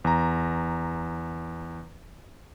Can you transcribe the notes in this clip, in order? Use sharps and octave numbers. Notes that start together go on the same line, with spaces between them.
E2 A#5